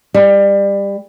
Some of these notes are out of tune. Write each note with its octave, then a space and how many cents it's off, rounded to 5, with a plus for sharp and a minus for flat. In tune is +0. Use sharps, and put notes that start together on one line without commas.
G3 +25